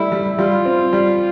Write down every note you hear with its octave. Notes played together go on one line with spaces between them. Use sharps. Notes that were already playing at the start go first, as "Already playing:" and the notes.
Already playing: G3 A3 E4
G3
G3 F4
C4
G3